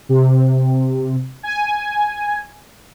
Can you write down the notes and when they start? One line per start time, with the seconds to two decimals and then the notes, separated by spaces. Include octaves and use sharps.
0.09 C3
1.43 G#5